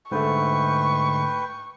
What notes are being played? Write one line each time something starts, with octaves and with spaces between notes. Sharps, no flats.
G#2 D3 A3 B4 G5 C#6